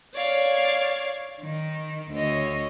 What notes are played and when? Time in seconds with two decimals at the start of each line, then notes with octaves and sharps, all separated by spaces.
0.13 C#5 D5 F5
1.40 D#3
2.13 D2 C#5 D#5